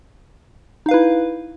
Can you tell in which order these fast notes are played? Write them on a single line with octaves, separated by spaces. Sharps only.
D#4 F5 B4 E4